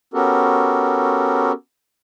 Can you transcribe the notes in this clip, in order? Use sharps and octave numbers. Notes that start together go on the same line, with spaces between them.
B3 C#4 F#4 G4 A4 A#4